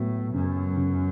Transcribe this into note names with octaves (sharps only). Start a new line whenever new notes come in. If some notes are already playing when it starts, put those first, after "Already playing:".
Already playing: A2 F#3 B3
F#2 C#3
C#3